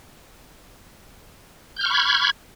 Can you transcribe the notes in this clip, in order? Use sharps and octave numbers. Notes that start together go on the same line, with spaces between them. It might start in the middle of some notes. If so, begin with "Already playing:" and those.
B5 C#6 F6 G6 G#6